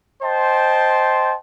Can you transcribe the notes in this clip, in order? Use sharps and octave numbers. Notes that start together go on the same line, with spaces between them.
C5 D#5 G5 A5 C6